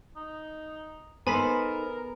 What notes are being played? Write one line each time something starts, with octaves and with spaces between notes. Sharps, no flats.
D#4
B3 D#4 A4 A#4 C5 G#5 B5 B6